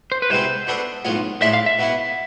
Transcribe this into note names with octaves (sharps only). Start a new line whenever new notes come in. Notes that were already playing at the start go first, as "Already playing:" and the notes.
C5
B4
C2 B2 G#3 C4 E4 C5
B2 B3 D4 A4 E5
B1 A2 G#3 B3 F4
A2 G#3 D4 A4 C5 E5
F5
E5
B2 B3 E4